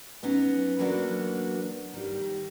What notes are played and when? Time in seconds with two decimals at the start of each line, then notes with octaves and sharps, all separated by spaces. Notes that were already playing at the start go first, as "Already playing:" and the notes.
0.23 F#3 B3 C#4 D#4
0.79 E3 F#3 A#3 B3 D4 F#4
1.94 D#3 G3